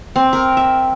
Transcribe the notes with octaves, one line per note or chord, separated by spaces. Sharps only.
C4
A#4
E5